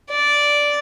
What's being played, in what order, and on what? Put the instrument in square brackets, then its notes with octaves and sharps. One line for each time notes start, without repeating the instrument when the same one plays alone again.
[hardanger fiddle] D5